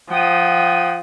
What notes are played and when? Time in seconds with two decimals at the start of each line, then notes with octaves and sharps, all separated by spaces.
0.11 F3 F#5 G5 D#6